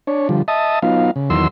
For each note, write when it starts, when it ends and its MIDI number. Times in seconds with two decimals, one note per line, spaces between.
0.07 0.28 62
0.07 0.28 73
0.29 0.42 50
0.29 0.42 53
0.29 0.42 55
0.48 0.79 75
0.48 0.79 76
0.48 0.79 81
0.48 0.79 87
0.82 1.11 54
0.82 1.11 59
0.82 1.11 63
0.82 1.11 65
0.82 1.11 77
1.16 1.30 49
1.30 1.48 40
1.30 1.48 51
1.30 1.48 54
1.30 1.48 84
1.30 1.48 88